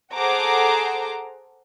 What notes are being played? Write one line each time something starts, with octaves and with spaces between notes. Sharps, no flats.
G#4 A4 C5 F#5 A#5 D6